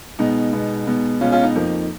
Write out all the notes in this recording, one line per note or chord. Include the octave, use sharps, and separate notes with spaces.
B2 G#3 B3 D#4
B2 G#3 B3
B2 G#3 B3
B2 G#3 B3 C#4 F4
C#4 F4
D#4
F2 F3 A#3 D#4